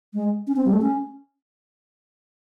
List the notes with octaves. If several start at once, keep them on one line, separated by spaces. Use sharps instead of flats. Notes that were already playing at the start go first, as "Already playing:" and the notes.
G#3
C#4
C4
G3
A3
C#4